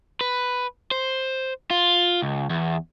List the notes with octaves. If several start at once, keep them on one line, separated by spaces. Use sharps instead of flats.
B4
C5
F4
C#2
E2